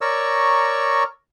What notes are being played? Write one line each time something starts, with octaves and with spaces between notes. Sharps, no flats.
A#4 C#5 D5 A#5 C#6 E6